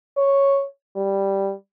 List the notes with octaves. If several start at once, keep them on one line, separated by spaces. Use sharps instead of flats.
C#5
G3